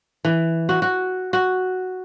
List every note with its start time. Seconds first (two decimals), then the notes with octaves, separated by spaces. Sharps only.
0.25 E3
0.69 F#4
0.82 F#4
1.33 F#4